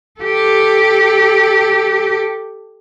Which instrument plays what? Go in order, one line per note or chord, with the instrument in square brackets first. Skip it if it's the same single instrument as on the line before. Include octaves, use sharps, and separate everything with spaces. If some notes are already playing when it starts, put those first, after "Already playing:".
[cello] G4 A4